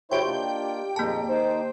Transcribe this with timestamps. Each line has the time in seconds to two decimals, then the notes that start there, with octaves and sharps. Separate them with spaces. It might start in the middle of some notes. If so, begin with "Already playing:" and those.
0.11 F#2 C#3 E4 G4 C5 C#5 G5
0.26 A#3 D4 D#4 F4
0.96 F2 A#2 D#3 A#3 G#4 A5 A#5
1.29 D#3 D#4 C5